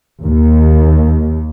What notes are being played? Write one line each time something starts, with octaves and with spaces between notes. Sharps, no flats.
D#2